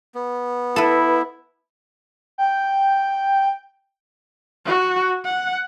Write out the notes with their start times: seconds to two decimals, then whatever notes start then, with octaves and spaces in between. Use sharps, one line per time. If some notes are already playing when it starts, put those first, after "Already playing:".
0.15 B3
0.76 E4 A4 B4
2.38 G5
4.66 F#4
5.25 F#5